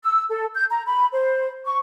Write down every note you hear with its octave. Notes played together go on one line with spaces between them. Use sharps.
E6
A4
G6
A#5
B5
C5
C#6